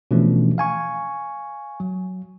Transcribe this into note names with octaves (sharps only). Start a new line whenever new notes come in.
B2 E3 F3 A3 C#4 D4
F5 G#5 C#6
F#3